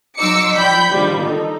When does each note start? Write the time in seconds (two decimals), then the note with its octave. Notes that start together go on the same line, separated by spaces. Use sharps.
0.17 F#3 D#4 C6 D6 E6 C#7
0.54 F3 D5 G5 B5 G6 B6
0.93 D3 D#3 F3 G3
1.23 D#4 A4